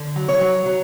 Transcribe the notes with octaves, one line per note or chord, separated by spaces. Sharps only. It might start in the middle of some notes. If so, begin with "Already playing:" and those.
Already playing: D3
F#3
C#5
F#3
F#3